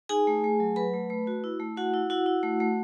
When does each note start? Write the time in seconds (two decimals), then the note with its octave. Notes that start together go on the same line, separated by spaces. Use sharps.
0.09 D#4 G#4 G#5
0.27 A3
0.44 A3
0.60 F#3
0.76 F#3 B4 B5
0.94 A3
1.10 A3
1.27 F#4
1.44 E4
1.60 A3
1.77 E4 F#4 F#5
1.94 E4
2.10 E4 F#4 F#5
2.26 E4
2.43 A3
2.60 A3